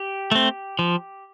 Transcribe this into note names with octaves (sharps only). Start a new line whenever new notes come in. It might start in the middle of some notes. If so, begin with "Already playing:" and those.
Already playing: G4
A3 C4
F3